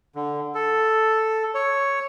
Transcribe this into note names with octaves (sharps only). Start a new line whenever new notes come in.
D3
A4
C#5